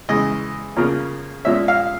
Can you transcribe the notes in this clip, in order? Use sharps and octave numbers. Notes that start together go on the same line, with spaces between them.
C#3 E3 G#3 D#5
C#3 F3 A#3 C#4
A#2 F3 G#3 C#4 E5
F5